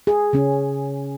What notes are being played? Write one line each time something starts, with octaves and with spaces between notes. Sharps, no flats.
G#4
C#3 C#4